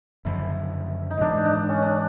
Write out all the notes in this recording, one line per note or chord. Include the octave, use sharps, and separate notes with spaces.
F#1 F#2 D3 F3 E4
D#4
G#2 E3 G#3 B3 D4
D#4
D4
C#4
D4